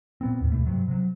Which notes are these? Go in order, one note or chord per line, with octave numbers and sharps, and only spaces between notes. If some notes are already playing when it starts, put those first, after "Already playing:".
A#2 B3 C4
D#2 G#2
D#2 B2 A3
G2 C3 F#3
C3 F#3